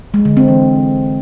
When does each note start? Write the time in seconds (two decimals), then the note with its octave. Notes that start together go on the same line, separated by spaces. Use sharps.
0.14 G#3
0.25 D3
0.37 C4
0.48 E3